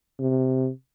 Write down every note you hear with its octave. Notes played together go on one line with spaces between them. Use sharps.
C3